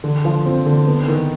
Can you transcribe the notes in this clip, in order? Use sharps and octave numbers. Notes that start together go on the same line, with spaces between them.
D3
F3
C4
D3
B3
D#3